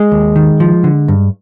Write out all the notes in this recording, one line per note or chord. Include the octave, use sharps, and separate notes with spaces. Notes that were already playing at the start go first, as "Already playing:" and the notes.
Already playing: G#3
D#2
D#3
F3
D3
G2